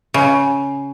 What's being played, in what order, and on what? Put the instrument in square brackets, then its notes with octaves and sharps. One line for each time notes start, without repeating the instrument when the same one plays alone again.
[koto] C#3